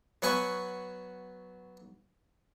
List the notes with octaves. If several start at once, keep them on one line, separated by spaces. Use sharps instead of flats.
F#3 B3 F#5 G#5 C#6